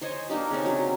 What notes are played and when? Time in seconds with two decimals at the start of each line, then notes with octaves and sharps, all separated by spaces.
0.02 C5 C#5 D#5 G#5
0.29 A#3 D4 D#4 G4
0.51 C#3 C4 C#4
0.66 F#3